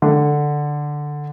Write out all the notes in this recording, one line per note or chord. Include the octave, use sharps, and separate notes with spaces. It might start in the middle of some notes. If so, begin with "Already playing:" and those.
D3